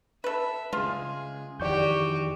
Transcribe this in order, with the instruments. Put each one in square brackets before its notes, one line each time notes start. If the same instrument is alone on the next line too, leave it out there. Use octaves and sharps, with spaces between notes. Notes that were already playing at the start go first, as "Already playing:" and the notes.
[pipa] A4 B4 [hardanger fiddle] E5
[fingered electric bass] C#3 G#3 [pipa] F4 [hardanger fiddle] G#4
[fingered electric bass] F2 D#3 E3 [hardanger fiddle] F#4 G4 [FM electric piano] D5 C#6 G6